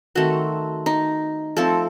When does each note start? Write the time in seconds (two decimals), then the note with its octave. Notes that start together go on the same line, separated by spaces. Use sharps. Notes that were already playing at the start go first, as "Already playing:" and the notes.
0.15 D#3 A3 C4 F#4
0.86 D#4
1.57 F3 A3 C4 A4